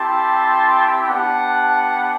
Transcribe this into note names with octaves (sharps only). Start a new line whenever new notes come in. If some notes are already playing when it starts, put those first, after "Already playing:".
Already playing: C4 E4 G4 A5 C6
B3 D4 G4 F#5 A5